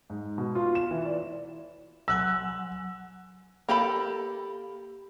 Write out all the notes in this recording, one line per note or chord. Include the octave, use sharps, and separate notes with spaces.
G#2
B2
F4
E7
E3
D5
F#3 F#5 G#5 E6 F#6
A#3 G4 A4 B5